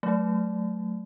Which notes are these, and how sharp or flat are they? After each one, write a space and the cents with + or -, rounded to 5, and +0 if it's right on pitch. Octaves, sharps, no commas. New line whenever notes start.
F#3 +0 A3 -10